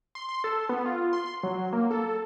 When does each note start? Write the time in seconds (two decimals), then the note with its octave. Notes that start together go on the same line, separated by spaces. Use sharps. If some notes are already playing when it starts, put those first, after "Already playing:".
0.15 C6
0.29 C6
0.44 A4
0.69 B3
0.86 F4
1.13 C6
1.43 F#3
1.73 A#3
1.91 A4